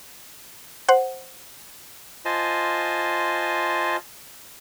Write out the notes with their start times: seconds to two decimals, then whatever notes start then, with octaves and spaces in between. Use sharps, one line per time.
0.89 C5 F#5
2.25 F4 C5 D#5 G#5 A5